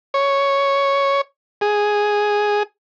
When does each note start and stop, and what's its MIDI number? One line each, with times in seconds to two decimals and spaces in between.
0.14 1.21 73
1.61 2.63 68